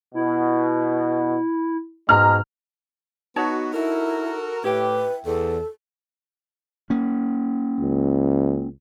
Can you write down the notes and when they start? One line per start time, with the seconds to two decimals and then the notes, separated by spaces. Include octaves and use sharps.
0.14 B2 E4
2.09 G#2 B2 G#3 A#5 F6
3.36 B3 D#4 F#4 C#5 A5
3.73 E4 F#4 A4 A#4
4.64 A2 E4 G4 B4 G5
5.25 E2 A4
6.90 A#3 C#4
7.80 C#2